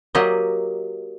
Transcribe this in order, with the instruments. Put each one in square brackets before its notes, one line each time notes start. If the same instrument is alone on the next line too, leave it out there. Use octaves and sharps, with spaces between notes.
[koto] F#3 A#3 G4 D5 D#5